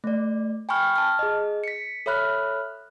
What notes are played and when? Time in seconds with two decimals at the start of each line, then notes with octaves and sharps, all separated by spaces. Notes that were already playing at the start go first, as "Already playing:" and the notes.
0.04 A3 D5
0.69 G5 G#5 B5 C#6 F6
0.96 A5 F6
1.19 G#4 D#5
1.64 B6 C#7
2.06 A4 C#5 E5 B5 F6 F#6